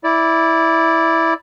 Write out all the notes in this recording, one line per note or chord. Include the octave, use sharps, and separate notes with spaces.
E4 D5